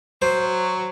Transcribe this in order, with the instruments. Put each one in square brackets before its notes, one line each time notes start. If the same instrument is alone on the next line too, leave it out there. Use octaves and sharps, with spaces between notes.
[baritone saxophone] F#3 [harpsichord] C5